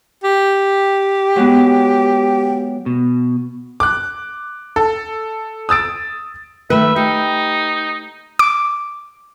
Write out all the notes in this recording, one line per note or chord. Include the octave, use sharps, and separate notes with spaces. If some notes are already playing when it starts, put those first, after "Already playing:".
G4
F#3 G#3 B3
B2
D6 F#6
A4
D#6 E6 A6 D7
D#3 A3 B4 E5
D#4 G4
D6